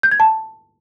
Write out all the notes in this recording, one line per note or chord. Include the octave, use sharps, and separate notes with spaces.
G6
G#6
A5